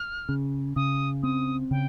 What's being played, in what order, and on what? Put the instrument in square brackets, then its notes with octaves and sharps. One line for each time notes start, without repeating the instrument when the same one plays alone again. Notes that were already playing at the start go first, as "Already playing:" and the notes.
Already playing: [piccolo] F6
[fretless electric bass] C#3
[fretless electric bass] C#3 [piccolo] D#6
[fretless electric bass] C4 [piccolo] D#6
[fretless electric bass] C#3 [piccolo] G5